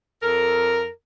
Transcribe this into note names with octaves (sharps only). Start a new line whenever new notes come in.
F2 A4 A#4